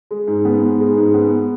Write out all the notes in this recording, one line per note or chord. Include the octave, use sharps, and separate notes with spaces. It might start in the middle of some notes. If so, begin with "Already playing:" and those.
G#3
G#2
B3
G#2
G#3
G#2
B3